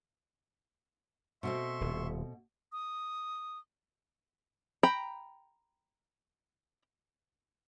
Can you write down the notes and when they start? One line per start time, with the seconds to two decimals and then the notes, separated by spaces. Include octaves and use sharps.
1.43 B2 A3 C4 E5 C6 C#6
1.81 D#1
2.72 D#6
4.83 G5 A#5 B5